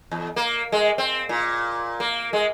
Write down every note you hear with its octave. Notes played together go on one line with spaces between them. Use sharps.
E2
A#3
G#3
C4
A#2
A#3
G#3